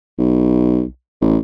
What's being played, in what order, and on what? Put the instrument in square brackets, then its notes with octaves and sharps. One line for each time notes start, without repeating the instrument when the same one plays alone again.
[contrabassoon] B1
A1